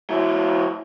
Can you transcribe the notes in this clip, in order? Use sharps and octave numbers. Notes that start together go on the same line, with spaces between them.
F#3 E4